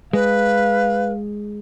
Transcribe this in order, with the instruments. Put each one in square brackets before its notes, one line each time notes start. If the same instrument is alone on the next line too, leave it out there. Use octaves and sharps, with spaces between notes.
[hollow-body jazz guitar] G#3 [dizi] B4 [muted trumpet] F5